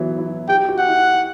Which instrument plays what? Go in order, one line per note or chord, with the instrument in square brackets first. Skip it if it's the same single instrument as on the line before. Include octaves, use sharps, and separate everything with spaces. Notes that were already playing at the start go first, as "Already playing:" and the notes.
Already playing: [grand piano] E3 F#3 B3
E4
[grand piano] G4 [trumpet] G5
[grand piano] F#4
[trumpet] F#5
[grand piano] E4